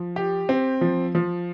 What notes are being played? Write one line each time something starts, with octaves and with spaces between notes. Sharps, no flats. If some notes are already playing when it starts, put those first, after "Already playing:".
Already playing: F3
G4
C4
F3
F3